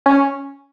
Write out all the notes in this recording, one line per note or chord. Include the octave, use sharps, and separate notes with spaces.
C#4